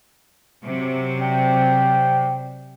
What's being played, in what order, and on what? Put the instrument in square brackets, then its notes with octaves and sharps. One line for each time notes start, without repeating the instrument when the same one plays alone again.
[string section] C3 F#3
[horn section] C4 D5 G5